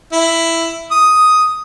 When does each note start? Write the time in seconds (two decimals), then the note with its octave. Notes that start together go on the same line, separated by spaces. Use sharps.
0.12 E4
0.91 D#6